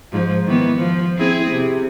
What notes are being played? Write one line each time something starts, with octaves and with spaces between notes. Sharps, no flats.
G#2 F3
D#3 E3 B3
F3
C4 E4 G#4
C3